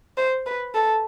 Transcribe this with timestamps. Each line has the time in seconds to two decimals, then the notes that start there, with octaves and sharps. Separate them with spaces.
0.17 C5
0.46 B4
0.74 A4